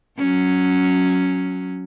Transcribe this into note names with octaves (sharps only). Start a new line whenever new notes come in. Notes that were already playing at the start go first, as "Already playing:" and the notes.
F#3 C#4